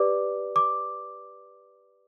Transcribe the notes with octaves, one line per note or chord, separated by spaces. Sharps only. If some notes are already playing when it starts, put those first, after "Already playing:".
Already playing: G4 B4 D5 D6
D6